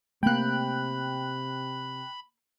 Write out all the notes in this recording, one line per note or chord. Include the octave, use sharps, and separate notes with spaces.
C3 A3 A#3 G5 B5 F#6